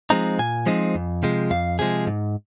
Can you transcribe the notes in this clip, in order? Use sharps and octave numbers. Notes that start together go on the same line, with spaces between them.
F3 G#3 C4 D#4 A#5
A#2 G#5
F3 G#3 C4 D#4
F2
C3 F3 G#3
F2 F5
C3 F3 G#3 G#4
G#2